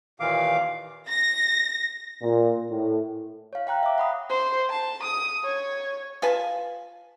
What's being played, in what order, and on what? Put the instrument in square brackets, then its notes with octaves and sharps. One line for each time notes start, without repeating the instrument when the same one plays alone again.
[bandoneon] D#2 A#2 D#3 E3 F5 D6
[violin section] A#6
[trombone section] A#2
A2
[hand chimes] C#5 F5
F5 G5 A#5 F#6
E5 D6
F#5 B5 D#6
[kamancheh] C5
A5
D#6
C#5
[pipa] F4 B4 G#5 A5